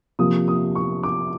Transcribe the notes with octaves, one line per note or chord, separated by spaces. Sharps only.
C3 F3 A#3 D#6
D#6
C#6
D6